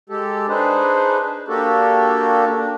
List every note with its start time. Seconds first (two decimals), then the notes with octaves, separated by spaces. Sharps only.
0.10 G#3 G4 A4
0.48 D4 D#4 G#4 B4 C5
1.48 A#3 D4 F#4 G4 A4
2.56 D4